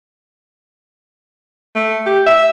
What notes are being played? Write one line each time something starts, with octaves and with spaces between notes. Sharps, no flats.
A3
G4
E5